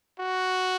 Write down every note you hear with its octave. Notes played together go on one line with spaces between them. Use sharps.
F#4